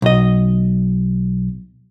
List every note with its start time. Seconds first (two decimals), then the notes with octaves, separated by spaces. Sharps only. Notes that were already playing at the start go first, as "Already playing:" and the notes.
0.02 B1 D#5